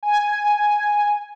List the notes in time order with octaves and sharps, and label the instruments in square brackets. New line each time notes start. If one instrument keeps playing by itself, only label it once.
[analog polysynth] G#5